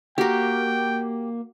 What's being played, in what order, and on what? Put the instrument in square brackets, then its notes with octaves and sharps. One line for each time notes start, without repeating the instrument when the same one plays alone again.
[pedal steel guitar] A#3 [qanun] F#4 A#4 [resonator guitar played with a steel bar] G4 [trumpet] G5